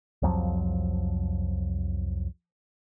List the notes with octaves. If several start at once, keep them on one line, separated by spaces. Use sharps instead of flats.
C2 F2 F3 F#3